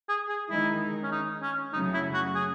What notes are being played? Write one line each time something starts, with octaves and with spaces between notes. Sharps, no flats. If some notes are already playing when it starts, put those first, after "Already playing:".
G#4
G#4
D#3 G#3 D#4 E4
C#4
D#4
C#4
F#2 C#3 F#3 A3 C#4 D#4
E4
F#4
G#4